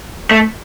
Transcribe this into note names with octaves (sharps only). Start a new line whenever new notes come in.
A3